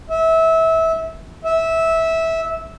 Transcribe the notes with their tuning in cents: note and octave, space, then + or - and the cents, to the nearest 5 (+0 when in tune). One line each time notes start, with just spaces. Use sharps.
E5 -25
E5 -15